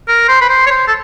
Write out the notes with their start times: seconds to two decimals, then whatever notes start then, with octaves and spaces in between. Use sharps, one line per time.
0.08 A#4
0.29 C5
0.41 B4
0.49 C5
0.67 C#5
0.71 C5
0.88 A4